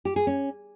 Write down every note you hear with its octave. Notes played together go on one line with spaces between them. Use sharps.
G4
G#4
C#4